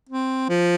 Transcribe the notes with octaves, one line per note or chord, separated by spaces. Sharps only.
C4
F3